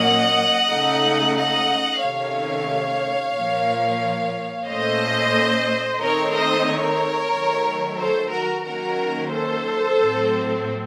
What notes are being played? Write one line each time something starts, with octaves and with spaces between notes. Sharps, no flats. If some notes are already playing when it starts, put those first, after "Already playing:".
Already playing: A#2 F#3 A#3 C#4 D#5 F#5
C#3 A3 D#4
D#5 F#5
C3 D#3 A3 C#4 C#5 F5
A#2 F3 A#3
A#2 A3 C#4 C5 D#5
D#3 A3 C4 D#4 A#4 C#5
C5 D#5
A#4 C#5
D#3 F#3 A3
A4 C5
F#4 A#4
D#3 F#3 A#3 C#4 F#4 A#4
A4 C5
A2 F#3 C4